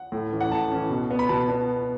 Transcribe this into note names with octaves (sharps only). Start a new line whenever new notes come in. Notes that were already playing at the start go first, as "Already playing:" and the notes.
Already playing: F#5
A2
E3 C#4
F#5
A2 A5
E3 C#4
B2
B3
B5
B2 A5
B3